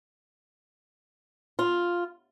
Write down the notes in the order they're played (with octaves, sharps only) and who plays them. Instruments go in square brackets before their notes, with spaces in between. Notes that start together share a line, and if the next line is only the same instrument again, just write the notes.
[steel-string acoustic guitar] F4